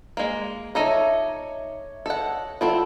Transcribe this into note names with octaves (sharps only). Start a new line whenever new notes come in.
G#3 A#3
D#4 A4 C#5 E5 A#5 D6
A4 D#5 F#5
G3 C4 E4 F4 A4 F#5